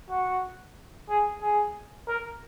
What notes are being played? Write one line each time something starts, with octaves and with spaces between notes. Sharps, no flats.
F#4
G#4
G#4
A#4